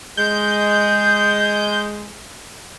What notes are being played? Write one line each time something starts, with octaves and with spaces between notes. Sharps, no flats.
G#3 G6